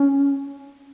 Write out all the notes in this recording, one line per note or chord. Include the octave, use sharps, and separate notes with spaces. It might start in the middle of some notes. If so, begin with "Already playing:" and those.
Already playing: C#4